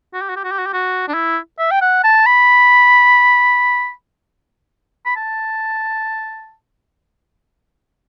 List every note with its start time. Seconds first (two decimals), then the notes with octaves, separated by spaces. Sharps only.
0.14 F#4
0.22 G4
0.29 F#4
0.36 G4
0.44 F#4
0.51 G4
0.59 F#4
0.66 G4
0.73 F#4
1.08 D4
1.14 E4
1.59 E5
1.71 G5
1.81 F#5
2.04 A5
2.26 B5
5.06 B5
5.16 A5